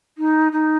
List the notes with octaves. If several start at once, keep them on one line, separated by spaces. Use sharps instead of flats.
D#4
D#4